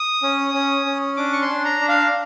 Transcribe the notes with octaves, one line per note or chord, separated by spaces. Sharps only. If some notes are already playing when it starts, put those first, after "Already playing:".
Already playing: D#6
C#4
C#4
C#4
D4 D6
C#6
C6
D4
A#5
D4
F5